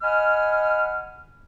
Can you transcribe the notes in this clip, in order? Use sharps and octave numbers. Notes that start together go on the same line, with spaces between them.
D#5 F#5 G#5 B5 F6